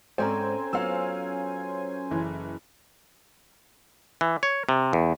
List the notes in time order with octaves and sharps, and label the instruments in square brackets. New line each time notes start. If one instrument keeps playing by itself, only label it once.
[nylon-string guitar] G#2 D5 [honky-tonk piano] C4 [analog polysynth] C#4 C5 G#5 [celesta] A4 A#5
[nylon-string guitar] F#3 B3 F4 [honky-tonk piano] F5 E6
[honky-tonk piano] F#1 E3
[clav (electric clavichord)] E3
C#5
C3
E2